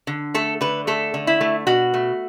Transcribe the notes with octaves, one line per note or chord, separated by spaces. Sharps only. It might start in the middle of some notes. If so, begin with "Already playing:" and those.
D3
A3 A4
D3 B4
A3 A4
D3
E4
A3
B2 F#4
A3